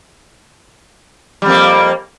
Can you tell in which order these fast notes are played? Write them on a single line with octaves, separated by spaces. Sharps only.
G3 F2 A#3